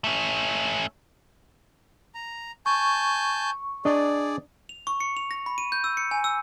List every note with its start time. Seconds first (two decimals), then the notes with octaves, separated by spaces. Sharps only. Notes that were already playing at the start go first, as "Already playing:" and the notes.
0.04 A3 C#4
2.15 A#5
2.66 G#5 A5 C#6 G6
3.85 D4 G#4 D5 D#5
4.69 F7
4.87 C#6
5.00 C#7
5.17 F7
5.31 A#6
5.46 B5
5.58 D#7
5.72 G6
5.84 E6
5.97 C#7
6.11 G#5
6.24 E6